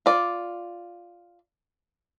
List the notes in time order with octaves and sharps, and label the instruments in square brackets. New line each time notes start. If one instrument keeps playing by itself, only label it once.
[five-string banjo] F4 D5